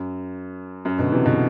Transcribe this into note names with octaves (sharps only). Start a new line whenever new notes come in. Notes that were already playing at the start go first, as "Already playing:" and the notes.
Already playing: F#2
F#2
B2 D3
C3 E3
B2 D3